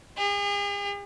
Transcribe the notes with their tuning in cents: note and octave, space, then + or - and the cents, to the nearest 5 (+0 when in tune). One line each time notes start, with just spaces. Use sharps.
G#4 -45